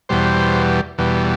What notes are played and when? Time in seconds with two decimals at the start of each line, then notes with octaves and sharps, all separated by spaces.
0.09 E2 B2 G3 C5
0.98 E2 B2 G3